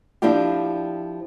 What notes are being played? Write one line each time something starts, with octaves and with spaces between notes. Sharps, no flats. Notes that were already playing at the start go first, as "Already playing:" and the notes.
F3 C4 D4 E4 F4 G4